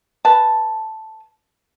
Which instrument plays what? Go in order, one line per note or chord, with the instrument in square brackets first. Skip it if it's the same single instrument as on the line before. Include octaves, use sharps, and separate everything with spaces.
[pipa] B4 A5